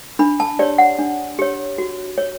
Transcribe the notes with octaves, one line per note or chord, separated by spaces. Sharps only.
D4 B5
A5
G4 C#5 D5
F#5
D4
G4 C#5
F#4
C#5